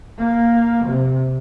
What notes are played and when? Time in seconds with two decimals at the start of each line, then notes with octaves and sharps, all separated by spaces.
0.18 A#3
0.85 C3